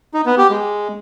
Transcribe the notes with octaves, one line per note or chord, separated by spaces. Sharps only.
D#4
B3
G4
G#3